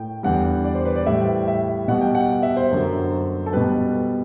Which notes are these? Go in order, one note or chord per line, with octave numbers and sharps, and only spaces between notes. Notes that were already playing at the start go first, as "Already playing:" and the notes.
Already playing: A2 G5
E2 D3 G3 F#5
D5
C5
B4
D5
A2 G3 E5
E5
B2 G3 F#5
G5
F#5
E5
C5
F#2 D3 F#3
A4
B2 G3 B4